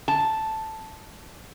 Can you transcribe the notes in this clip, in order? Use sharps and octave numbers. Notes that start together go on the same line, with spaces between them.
A5